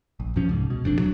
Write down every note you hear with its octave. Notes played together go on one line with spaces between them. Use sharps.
A#1
F2 B2 F3 C#4
C2 G#2
B2
F1 F2 C4 D4
D1 F#3